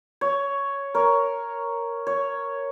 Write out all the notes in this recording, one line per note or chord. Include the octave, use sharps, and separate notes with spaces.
C#5
A#4 C#5
C#5